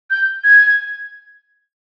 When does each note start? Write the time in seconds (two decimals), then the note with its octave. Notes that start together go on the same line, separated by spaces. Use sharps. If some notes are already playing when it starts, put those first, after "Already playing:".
0.10 G6
0.44 G#6